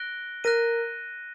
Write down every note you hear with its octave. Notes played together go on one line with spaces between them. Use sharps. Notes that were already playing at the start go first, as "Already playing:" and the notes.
Already playing: F#6 A#6 D7 G7
A#4 F#6 A#6 D#7